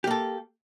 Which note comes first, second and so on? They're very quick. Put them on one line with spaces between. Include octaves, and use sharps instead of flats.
G4 A#3 A4